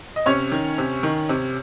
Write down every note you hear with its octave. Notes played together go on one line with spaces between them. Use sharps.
D#5
C3 C#4 C#5
D#3
C3
D#3
C3